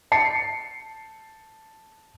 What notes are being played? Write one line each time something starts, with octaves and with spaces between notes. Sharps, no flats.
A5 C7 C#7